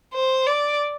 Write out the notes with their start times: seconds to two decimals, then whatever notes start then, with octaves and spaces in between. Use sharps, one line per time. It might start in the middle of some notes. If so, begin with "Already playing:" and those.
0.14 C5
0.47 D5